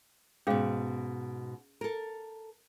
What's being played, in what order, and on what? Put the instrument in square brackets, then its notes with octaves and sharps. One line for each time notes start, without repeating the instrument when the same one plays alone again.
[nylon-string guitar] G#2 B2 [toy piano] C#4 G#4 F5
[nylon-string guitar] A4 A#4